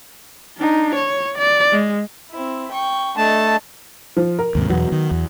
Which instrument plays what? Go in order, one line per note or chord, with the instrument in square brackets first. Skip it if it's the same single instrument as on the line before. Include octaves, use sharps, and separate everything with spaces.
[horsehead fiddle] D4 D#4
C#5
D5
G#3
[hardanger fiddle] C4 E4
G5 C#6
[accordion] A3 A5 [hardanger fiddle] D4 D#5
[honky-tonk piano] F3
A#4
[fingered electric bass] D#2 G#2 C3
[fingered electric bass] E2 B2 [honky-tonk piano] F#3 B3
[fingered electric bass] D#3
E2